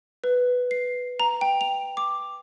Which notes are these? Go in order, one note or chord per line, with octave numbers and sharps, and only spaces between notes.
B4
C7
A#5
G5
F7
D6